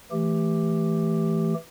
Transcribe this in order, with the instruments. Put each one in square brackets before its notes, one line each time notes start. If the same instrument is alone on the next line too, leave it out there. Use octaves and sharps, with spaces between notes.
[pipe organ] E3 A3 G4